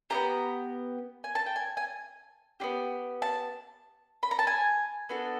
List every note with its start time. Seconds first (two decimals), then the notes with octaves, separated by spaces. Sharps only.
0.10 B3 D4 G4 A#5
1.24 G#5
1.35 A5
1.46 G5
1.56 G#5
1.77 G#5
2.60 B3 D4 G4
3.22 A5
4.23 B5
4.31 A#5
4.39 A5
4.47 G#5
5.09 B3 D4 F#4 A4